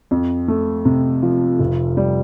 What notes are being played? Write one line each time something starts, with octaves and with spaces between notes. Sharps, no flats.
F2
A3
C3
F3
F1
G3